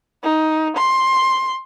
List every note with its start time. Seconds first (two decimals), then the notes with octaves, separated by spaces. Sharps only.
0.24 D#4
0.77 C6